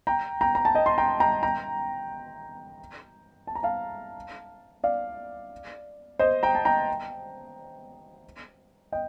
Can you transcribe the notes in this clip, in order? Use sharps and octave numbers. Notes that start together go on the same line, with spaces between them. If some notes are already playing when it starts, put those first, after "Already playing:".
G5 A#5
G5 A#5
A#5
A5
D#5 G5
C6
G5 A#5
G5 A#5
G5 A#5
A5
A#5
F5 A5
D5 F5
C5 D#5
G5 A#5
A5
G5 A#5
D#5 G5